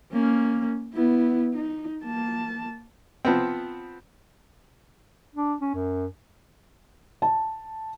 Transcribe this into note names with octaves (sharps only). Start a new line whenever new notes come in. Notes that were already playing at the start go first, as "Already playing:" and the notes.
A#3 C#4
B3 E4
D#4
A#3 A5
F3 B3 C4
D4
C#4
F#2
A5